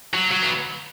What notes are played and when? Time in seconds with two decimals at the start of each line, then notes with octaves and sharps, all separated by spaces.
0.14 F#3
0.31 F#3
0.42 B3